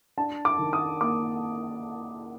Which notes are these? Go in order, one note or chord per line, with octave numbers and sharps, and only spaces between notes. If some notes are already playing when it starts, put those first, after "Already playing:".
D4 A5
D6
D#3
D#6
A#3 D6